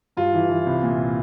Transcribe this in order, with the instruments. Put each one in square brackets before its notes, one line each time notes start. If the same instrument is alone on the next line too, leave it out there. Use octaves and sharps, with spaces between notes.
[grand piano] G2 F4
E3
E3
C2
A#2